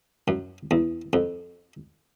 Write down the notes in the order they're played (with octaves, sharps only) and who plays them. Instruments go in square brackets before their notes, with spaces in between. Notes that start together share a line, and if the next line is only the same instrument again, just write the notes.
[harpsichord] F#2
E2
F2